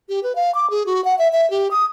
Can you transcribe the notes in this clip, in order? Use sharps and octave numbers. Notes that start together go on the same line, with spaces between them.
G4
B4
F5
D6
G#4
F#4
F#5
E5
E5
G4
D#6